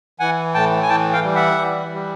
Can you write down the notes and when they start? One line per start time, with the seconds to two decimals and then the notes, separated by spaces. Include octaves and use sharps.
0.20 E3 F#5 G#5
0.54 A2 G5 A5
0.83 G#5
0.89 E3 G5 A5
1.13 F5 G5
1.24 G3
1.36 E5 F#5
1.59 E3
1.93 G3